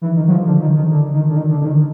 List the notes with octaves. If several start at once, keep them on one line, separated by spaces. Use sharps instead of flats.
E3
D#3
F#3
F3
D3
D#3
D#3
D3
D#3
D3
D#3
D3
D3
D#3